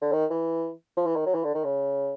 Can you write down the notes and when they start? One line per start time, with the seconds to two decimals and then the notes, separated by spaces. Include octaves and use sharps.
0.02 D3
0.12 D#3
0.30 E3
0.97 F3
1.06 E3
1.16 D#3
1.26 F#3
1.34 E3
1.44 D3
1.55 D#3
1.64 C#3